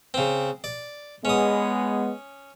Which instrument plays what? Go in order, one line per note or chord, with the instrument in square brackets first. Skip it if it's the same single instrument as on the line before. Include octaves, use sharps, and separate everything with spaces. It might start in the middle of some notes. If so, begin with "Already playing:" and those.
[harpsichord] C#3 C4
D5
[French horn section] G#3 B3 [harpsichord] C#4 D#6